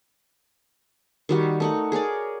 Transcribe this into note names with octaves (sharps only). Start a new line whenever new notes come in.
D#3 G3 F#4
A3 D#4 F#5
G#4 A#4 C#5 D5